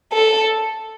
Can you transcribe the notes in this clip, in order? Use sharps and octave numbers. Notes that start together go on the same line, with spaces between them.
A4